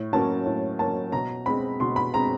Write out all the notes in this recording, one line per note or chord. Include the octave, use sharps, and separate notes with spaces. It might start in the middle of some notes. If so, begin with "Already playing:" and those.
Already playing: A2
F#3 A#3 C#4 A5
A2
F#3 A#3 C#4 A5
B2 A#5
G#3 C4 B5
B2 C6
B5
G#3 C4 A#5